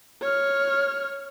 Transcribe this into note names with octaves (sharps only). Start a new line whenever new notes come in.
C#5 F6